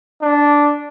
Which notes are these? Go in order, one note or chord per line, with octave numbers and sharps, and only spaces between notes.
D4